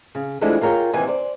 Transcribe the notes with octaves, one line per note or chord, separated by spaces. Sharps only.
C#3
E3 F3 G#3 A3 D4 E4
F4 G#4 A#4 C#5 G5
D#2 C3 E3 G#5
C5 D5